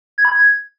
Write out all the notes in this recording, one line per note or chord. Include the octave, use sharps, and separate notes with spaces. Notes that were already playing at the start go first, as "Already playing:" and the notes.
G#6
B5
G#6